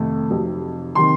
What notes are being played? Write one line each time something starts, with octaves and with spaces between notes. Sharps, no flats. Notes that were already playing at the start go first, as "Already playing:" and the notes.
Already playing: F2 C3 D#3 A3
F1 F2 C3 F#3
C3 D#3 C6